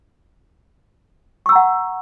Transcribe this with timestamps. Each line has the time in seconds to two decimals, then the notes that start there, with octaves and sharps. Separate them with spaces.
1.46 C#6
1.49 E6
1.52 A#5
1.55 F#5